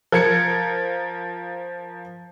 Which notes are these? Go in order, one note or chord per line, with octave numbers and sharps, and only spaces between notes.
F3 A#4 G#6 C#7